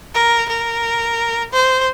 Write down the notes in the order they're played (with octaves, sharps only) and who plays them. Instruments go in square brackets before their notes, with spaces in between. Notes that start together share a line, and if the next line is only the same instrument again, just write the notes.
[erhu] A#4
A#4
C5